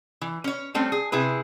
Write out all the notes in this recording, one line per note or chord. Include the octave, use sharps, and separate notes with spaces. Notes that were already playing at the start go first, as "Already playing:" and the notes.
E3
C#4 C#5
G3 A3 C4 C#4
G#4
C3 E4 G#4 B4